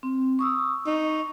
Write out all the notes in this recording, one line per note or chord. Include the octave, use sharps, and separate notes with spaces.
C4
C#6 D#6 E6
D#4 C#6